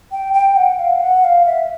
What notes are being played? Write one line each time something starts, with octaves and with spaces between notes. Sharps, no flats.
G5
G5
F#5
F5
F#5
F5
E5